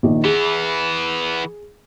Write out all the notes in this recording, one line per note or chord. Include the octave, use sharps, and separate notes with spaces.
A#1 D#3
E3 B3 G#4